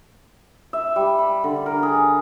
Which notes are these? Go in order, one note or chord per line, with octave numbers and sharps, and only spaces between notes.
E5
G3
B5
D3
A#4
G#4